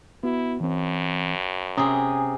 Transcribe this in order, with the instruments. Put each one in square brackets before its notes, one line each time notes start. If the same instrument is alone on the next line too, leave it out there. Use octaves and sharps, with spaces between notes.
[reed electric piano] B3 F#4 [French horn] E4
[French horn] F#2 [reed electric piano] E3 C4
[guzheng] C3 G#4 [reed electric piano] C#4 A#5 D#6